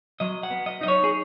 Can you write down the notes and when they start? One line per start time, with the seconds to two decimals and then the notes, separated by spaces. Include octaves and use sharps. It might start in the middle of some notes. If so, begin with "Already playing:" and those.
0.20 F#3 D#5
0.43 F#5
0.50 B3
0.66 D#5
0.81 D#4 D#5
0.88 C#5
1.04 G#4